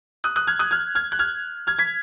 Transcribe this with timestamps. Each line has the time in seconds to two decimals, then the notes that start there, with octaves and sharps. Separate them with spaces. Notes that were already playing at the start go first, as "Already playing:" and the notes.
0.24 D#6 F#6
0.36 D#6 F#6
0.47 F6 G#6
0.59 D#6 F#6
0.71 F6 G#6
0.95 F6 G#6
1.12 F#6
1.19 F6 G#6
1.67 F6 G#6
1.79 G#6 B6